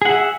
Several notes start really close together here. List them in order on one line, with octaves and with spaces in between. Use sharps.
G#4 F#5 E5